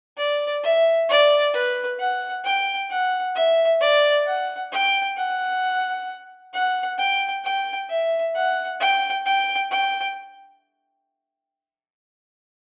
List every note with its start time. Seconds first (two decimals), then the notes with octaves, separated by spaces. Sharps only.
0.18 D5
0.63 E5
1.09 D5
1.54 B4
2.00 F#5
2.45 G5
2.90 F#5
3.36 E5
3.81 D5
4.26 F#5
4.72 G5
5.17 F#5
6.53 F#5
6.99 G5
7.44 G5
7.89 E5
8.35 F#5
8.80 G5
9.26 G5
9.71 G5